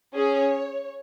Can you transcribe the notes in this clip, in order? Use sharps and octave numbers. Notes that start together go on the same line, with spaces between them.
C#4 G#4 C#5